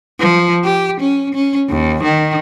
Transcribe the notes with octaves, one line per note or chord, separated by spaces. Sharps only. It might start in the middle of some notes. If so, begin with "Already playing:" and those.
F3
G4
C#4
C#4
D#2
D#3